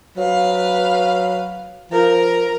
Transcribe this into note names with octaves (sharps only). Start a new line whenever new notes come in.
F#3 B4 F5
F3 A#4